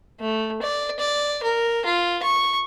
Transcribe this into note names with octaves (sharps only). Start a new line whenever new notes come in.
A3
D5
D5
A#4
F4
C#6